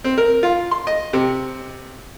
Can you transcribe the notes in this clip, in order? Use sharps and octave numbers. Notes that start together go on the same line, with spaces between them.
C4
A#4
F4
C6
D#5
C3